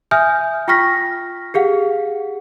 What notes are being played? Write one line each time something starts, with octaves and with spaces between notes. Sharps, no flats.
E5 G#5 D#6 F6 G6
F4 G5 C#6 F6 A#6 B6
G4 G#4 F5 F#5